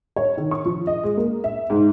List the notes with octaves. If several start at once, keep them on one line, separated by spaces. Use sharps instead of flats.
C#5
D#3
C#6
F3
D#5
G#3
A#3
E5
G#2